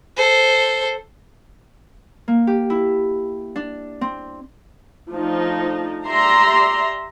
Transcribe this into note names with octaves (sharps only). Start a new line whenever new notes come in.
A4 C5
A#3
G4
E4
D4
C4
F3 A3 D4 D#4
G4 D5 E5 A#5 C6